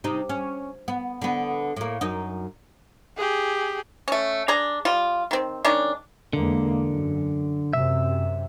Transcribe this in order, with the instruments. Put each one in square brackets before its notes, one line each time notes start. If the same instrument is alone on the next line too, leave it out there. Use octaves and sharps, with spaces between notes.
[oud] C3 D#4
C#4
B3
D3 B3
A2 A#3
F#2 D#4
[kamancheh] G4 G#4
[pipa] A3 C#4
D4 G#4 A#5
G3 F4
D#3 C4
D#3 G#3 C#4 D4
[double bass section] E2 G#3 A#3 [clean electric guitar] D3
[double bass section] F#2
[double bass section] F#2 C3 [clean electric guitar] E5